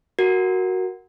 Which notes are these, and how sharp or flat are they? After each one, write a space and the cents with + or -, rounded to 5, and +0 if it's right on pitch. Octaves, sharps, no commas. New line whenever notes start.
F#4 +0 A#4 +0